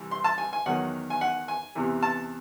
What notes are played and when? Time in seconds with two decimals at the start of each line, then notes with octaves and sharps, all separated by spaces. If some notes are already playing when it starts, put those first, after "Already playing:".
Already playing: C2 C3 E3
0.11 C6
0.24 A5
0.38 G#5
0.53 G#5
0.66 E2 D#3 F#3 F#5
1.10 G#5
1.21 F#5
1.48 G#5
1.75 E2 C3 E3
2.03 A5